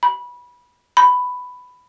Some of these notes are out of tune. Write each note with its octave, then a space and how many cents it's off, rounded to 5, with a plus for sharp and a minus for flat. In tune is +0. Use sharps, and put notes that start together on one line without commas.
B5 -20
B5 +10